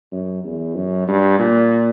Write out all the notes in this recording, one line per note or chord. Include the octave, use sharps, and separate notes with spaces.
F#2
E2
F#2
G2
A#2